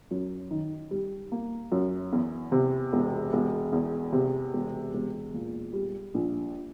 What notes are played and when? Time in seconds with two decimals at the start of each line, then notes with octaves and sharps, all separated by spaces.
0.11 F#2
0.51 D#3
0.91 G3
1.32 A#3
1.72 F#2
2.13 E2
2.52 C3
2.93 E1
3.33 E1
3.73 E2
4.13 C3
4.53 E1
4.94 E1
5.34 A#2
5.73 G3
6.14 A#1